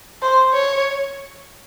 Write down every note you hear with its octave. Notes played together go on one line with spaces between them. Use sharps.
C5
C#5